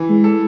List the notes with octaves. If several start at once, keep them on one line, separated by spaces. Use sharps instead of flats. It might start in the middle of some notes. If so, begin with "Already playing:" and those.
Already playing: E3
G#3
A4